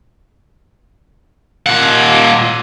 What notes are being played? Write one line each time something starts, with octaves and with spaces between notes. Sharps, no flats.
A#2 F#5